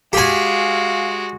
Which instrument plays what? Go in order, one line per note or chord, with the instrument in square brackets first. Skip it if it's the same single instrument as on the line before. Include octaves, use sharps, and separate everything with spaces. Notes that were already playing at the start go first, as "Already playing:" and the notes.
[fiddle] G#3 F#4 [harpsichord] G4 G#5 [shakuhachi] F5